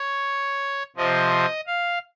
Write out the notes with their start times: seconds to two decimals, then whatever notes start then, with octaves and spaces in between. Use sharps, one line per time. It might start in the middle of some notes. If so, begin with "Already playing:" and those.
Already playing: C#5
0.96 C3 F3 C4 D#5
1.67 F5